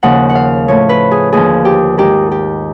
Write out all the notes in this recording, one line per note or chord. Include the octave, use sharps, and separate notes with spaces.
D#2 C#3 F3 F#5
F#5
F5
A2 F3 C#5
B4
G#4
D#2 D3 F3 G#4
G4
G#2 D#3 G4
G4